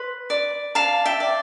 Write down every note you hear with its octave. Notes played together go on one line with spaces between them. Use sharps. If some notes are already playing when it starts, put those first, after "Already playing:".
Already playing: B4 C6
D5
D5 F5 A5
E5 G5
D5